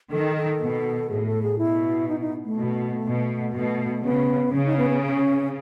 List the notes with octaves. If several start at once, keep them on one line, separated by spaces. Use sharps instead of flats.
D#3 A4
A4
B2
A2 G#4
A4
G#4
B2 E4
D#4
D#4
A3
B2
B2
B2 A3
C#3 B3
C#3 C#4
D#4
B3
B3
C#4